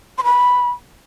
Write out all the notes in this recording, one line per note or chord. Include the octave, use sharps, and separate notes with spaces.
C6
B5